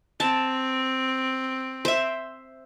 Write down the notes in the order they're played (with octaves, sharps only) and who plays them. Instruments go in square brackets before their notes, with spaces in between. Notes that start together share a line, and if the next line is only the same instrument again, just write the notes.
[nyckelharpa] C4 [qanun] A5
[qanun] C5 E5